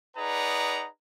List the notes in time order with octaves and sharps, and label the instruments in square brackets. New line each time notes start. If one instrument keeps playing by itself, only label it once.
[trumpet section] D#4 G#4 B4 D5 F#5 A#5